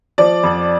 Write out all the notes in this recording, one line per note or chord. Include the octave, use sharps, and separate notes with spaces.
F3 D5
F2